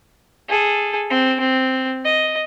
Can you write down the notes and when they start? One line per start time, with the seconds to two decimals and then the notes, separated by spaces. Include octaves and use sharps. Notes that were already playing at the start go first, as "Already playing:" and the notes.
0.48 G#4 A4
1.10 C4
1.40 C4
2.04 D#5